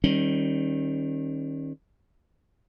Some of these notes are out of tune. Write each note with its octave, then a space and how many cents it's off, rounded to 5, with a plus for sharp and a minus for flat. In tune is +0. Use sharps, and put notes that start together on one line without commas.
D#3 +0 G3 +0 C#4 -35